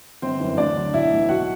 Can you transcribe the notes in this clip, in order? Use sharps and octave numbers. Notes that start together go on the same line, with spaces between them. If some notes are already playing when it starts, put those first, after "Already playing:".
G1 C4 C5
F#2 E3
D2 D4 D5
D3 F#3
B1 E4 E5
A2 E3
B1 F#4 F#5